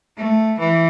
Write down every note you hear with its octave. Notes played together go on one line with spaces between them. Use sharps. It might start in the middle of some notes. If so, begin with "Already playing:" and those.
A3
E3